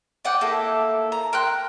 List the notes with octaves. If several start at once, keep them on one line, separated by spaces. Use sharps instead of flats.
D5 D#5 F#5 G5
A#3 E4 A4
A#5
A#4 G5 C6 F#6